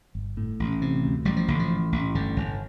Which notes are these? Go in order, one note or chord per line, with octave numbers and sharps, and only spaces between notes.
G1
A2
A1
C3
D2
A1 G3
F3
A1 D3
F3
A2
A1
G1 D3
G1